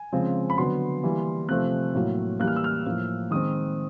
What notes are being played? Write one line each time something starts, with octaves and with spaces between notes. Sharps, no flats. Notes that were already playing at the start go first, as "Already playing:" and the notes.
Already playing: G#5
C#3 F3 G#3 C4
B5
D3 F#3 B3 C6
E3 G3 A#3
C3 F3 A3 C4 F#6
A2 F#3 A#3
E3 G3 A#3 F#6
F6
E6
F6
A2 F3 A#3
D#3 G#3 C4 D#6